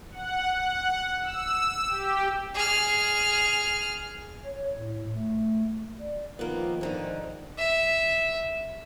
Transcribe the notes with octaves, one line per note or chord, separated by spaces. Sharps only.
F#5
F#5
E6
G4
G#4 F6
C#5
A2
A3
D5
D#3 F3 A#3 B3 F4
G#2 D3 D#4 C5
E5